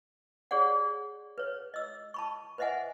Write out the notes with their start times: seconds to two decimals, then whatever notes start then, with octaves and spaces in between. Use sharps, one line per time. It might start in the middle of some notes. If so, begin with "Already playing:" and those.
0.51 G4 G#4 C#5 D5 F#5
1.38 B4 C#5
1.74 D#5 E6
2.14 A5 B5 C#6
2.58 B4 C5 D#5 E5 F#5 G#5